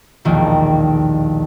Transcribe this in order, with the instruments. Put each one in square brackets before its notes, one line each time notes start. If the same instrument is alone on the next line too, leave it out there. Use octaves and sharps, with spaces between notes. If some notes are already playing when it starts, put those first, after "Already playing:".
[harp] E1 A#1 D#2 D#3